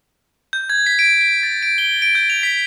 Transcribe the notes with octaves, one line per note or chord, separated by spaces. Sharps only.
G6
G#6
B6
D7
B6
A6
D7
G7
D7
G6
F7
B6